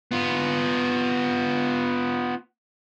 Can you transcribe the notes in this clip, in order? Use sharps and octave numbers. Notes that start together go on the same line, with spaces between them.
B3 F4